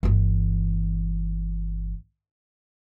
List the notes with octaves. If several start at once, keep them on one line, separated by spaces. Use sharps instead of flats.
G1 E3